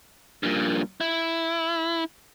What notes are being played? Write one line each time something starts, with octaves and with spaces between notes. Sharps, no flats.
G2 A#2
E4